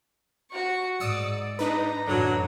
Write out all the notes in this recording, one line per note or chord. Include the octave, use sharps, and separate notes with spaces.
F#4 C#6
G#2 D5 D#6 E6 C#7
D4 D#4 B4 A#5
A1 F#2 D3 F#3